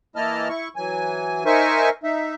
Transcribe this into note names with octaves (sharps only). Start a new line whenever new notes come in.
E3 A#3 E4 D#5 A5 F6
E4 C#6
E3 F#3 G#5
D#4 A#4 C5 E5 G#5 C#6
D#4 E5